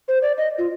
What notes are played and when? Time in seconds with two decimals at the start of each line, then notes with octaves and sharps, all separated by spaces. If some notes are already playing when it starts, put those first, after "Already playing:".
0.08 C5
0.22 D5
0.38 D#5
0.58 F4